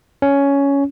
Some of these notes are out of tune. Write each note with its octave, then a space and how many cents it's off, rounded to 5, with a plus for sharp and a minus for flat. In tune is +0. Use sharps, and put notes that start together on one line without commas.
C#4 +10